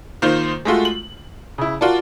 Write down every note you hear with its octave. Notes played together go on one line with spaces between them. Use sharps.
D#3 A#3 D#4 F4 C5
G#3 A3 F4 F#4
F#7
C#3 E4
F4 F#4 A#4 D5 A5